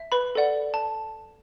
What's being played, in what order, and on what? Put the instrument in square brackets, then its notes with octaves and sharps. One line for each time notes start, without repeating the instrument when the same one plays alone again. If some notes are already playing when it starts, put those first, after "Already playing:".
Already playing: [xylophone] E5
B4 B5
A4 D5 F#5
A5